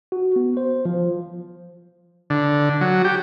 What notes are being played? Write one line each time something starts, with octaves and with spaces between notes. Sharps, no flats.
F#4
B3
C5
F3
D3
F#3
G4